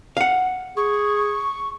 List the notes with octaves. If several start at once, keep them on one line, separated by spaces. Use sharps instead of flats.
F5 F#5
G#4 C#6